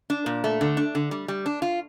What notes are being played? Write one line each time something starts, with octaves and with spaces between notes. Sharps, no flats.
D4
A#2
A3
D3
D4
D3
G3
G3
D4
F4